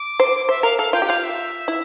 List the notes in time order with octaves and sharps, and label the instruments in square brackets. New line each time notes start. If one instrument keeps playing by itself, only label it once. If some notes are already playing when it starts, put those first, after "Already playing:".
Already playing: [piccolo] D6
[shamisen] C5
[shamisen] C5 [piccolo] E5
[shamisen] A#4 [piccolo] F5
[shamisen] A4 [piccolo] F5
[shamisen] F4 [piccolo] G5
[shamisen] G4
[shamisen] F4 [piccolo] F5
[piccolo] E5
[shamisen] E4